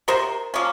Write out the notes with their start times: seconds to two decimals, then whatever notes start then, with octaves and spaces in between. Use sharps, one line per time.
0.08 C3 A#4 C5
0.54 F3 A#3 C#4